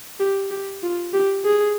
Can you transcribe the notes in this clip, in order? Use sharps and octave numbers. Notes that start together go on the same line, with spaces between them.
G4
G4
F4
G4
G#4